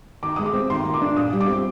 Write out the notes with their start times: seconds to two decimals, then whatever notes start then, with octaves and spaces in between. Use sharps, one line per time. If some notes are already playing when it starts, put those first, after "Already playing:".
0.23 D#3 D6
0.36 G#3 D#6
0.46 D6
0.53 C4
0.70 D#3 C6
0.85 A#3
0.94 D6
1.02 D4
1.16 A#2 D#6
1.33 G3
1.41 D6
1.48 C4